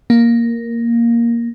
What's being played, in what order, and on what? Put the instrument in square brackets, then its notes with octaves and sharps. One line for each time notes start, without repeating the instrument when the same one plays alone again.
[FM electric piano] A#3